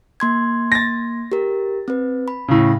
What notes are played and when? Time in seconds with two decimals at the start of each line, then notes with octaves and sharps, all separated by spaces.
0.20 A#3 C6 G#6
0.72 A6 A#6
1.32 G4 A#4
1.88 C4 B4
2.28 B5
2.48 A2 C#3